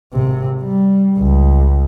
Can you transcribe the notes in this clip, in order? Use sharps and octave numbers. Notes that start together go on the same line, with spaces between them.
G#1 C3
G3
C#2